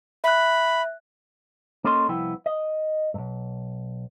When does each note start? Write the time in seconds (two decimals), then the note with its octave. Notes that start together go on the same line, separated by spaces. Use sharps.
0.24 E5 B5 F#6
1.84 A#3 C#4 A4 D#5 C6
2.09 C2 F3 B3 E4 G5
2.46 D#5
3.14 B1 G2